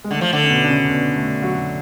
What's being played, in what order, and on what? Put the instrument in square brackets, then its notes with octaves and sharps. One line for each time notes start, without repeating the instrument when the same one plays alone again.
[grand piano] G#3
[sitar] D3 [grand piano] A3
[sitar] F3
D3
[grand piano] C#4
B2 B3
D4
C#3 C#4
B2 B3
A3
F#3 F#4